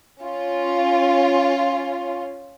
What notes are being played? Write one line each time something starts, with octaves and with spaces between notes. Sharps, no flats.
C#4 F4